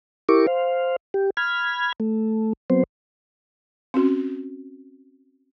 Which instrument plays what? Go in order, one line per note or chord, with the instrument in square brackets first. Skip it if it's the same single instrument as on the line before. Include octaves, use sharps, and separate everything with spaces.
[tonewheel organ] E4 G4 A#4 C#6 D6
C5 F5
G4
B5 F6 G#6
A3
F#3 B3 C4 C5
[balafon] C4 C#4 F#4